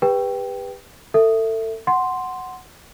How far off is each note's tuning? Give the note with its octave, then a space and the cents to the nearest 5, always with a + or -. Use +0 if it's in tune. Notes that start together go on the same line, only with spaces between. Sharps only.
G4 +40 B4 -5 G5 +0
A4 +30 E5 +0
F#5 +0 C6 +0